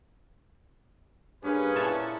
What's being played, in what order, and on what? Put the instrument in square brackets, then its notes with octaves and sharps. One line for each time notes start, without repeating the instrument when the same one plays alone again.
[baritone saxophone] G2 [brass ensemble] A#3 G#4 B4 [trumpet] C#4
[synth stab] A#2 A5 C#6 [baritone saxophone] E4